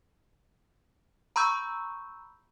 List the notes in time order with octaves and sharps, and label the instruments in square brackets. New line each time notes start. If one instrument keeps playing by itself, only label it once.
[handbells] A#5 B5 C#6 E6 G6